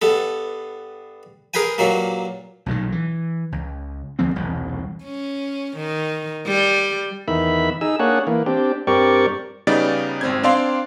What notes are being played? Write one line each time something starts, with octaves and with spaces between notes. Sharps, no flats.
G2 B3 A4
G#4 A#4 B4 G5 G#5
G2 A#2 F#3 A#3
B1 A#2 D3 D#3
E3
C#2
D2 F3 C4
E1 C2
C#4
D#3
G3
E2 D#3 E5 B5
D#4 G#4 E6
A#3 D4 G#4 C#5 F#5
E3 A#3
C4 D4 G4
G2 C4 G4 A#4 D5 C#6
C#3 G3 B3 D#4 D5 A6
G#1 C4 G#6
C4 D4 D5 F5 C6